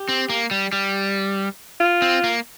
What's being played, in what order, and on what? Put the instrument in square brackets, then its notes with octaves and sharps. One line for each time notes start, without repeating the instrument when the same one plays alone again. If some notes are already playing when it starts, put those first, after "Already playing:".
Already playing: [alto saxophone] G4
[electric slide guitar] C4
A#3
G3
G3
[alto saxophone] F4
[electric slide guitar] C4
A#3